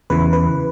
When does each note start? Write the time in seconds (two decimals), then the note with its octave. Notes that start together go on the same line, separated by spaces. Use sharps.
0.10 E2 C#3 E3 B4
0.33 B4